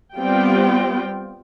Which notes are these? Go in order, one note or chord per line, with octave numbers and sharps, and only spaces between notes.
G3 B3 C4 F4 G5